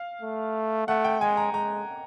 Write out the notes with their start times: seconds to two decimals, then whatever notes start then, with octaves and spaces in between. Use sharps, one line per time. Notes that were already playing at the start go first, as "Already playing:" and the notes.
Already playing: F5
0.22 A3
0.88 A3 F#5
1.04 G5
1.21 G#3 G#5
1.37 A#5
1.53 G#3 A#5